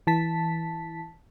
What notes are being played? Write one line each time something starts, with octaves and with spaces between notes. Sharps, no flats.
E3 A5 B6